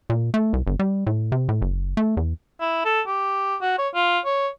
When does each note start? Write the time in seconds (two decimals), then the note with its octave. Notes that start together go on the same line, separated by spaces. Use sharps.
0.10 A#2
0.34 A3
0.53 C2
0.67 G1
0.79 G3
1.07 A2
1.32 C3
1.49 A2
1.61 F#1
1.97 A3
2.17 E2
2.61 E4
2.85 A4
3.07 G4
3.62 F#4
3.78 C#5
3.95 F4
4.25 C#5